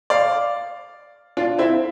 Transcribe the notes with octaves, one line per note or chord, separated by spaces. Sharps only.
D5 F5
D4 F4
C4 E4